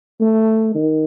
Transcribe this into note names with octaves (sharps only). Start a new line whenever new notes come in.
A3
D#3